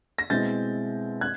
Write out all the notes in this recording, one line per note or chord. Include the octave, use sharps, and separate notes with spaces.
A#6
B2 G#3 C4 E4 G6 A6
F#6 G#6